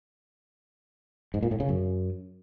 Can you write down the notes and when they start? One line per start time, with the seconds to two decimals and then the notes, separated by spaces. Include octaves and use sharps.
1.34 G#2
1.43 A#2
1.51 A2
1.60 C#3
1.69 F#2